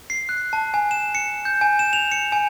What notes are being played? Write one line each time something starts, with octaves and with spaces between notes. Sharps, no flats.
C7
F#6
A5
G#5
E7
C#7
G6
G#5
E7
F7
C#7
G#5